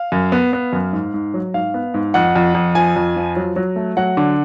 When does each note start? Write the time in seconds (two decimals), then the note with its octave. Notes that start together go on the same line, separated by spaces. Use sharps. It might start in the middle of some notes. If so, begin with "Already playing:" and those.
Already playing: F5
0.12 F#2
0.32 B3
0.53 B3
0.73 F#2
0.93 G#2
1.14 G#2
1.34 F#3
1.54 G#2 F5
1.74 B3
1.94 G#2
2.14 F2 F#5
2.36 F2
2.55 F2
2.75 F3 G#5
2.96 F2
3.16 F3
3.36 F#3
3.56 F#3
3.76 A3
3.97 F#3 F#5
4.17 D3